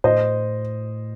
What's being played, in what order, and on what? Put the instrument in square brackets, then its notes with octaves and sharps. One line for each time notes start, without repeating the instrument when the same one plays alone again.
[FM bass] A2 [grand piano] C5 D#5